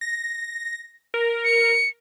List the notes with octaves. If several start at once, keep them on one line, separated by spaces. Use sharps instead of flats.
A#6
A#4
C#7